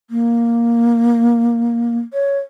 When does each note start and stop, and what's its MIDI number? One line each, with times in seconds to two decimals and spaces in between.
0.10 1.98 58
2.14 2.39 73